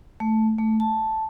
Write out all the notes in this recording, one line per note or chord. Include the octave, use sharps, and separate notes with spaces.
A3
A3
A5